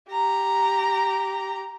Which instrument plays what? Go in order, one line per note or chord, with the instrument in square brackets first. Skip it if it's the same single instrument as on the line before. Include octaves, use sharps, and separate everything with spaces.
[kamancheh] G4 A#5